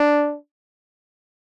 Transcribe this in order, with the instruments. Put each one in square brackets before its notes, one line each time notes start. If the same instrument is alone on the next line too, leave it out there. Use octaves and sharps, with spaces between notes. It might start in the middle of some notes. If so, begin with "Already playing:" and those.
Already playing: [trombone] D4